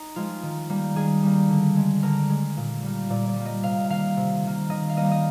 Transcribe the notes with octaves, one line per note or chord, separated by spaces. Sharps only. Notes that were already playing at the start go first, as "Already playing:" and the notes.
Already playing: D#4
F3 G#3 F4
D#3
G3 A#3
D#3 G#4
G3 A#3
D3
G#3
D3 A#4
G#3
A#2
G3 A#3
A#2 D5
D5
G3 A#3
D#5
C3 F5
D#3 A#3 F5
C3
D#3 A#3
D#3 D#5
F5
G3 A#3 D#5
D#5